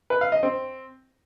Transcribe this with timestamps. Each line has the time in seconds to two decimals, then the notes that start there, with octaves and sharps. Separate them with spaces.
0.10 B4
0.21 F5
0.32 D#5
0.43 C4